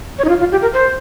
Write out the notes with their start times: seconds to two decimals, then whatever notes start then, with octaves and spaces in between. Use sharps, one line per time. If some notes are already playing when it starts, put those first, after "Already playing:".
0.18 C#5
0.24 D#4
0.29 F4
0.39 F4
0.52 G4
0.62 A#4
0.73 C5